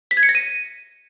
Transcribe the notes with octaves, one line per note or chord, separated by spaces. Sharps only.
B6
G#6
C#7
A#6
D#7